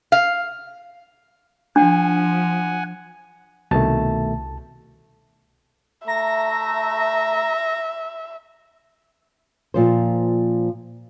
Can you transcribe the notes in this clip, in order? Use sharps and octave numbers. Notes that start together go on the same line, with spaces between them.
F5
F3 D4 F#5 G#5
C2 B2 D#3 A3 A5
A3 E5 A#5 A#6
A#2 F3 C5